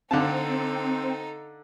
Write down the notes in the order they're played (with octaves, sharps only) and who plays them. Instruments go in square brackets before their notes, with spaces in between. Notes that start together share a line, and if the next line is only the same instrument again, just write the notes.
[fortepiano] D3 F5 A5 [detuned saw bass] C4 [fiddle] D#4 A4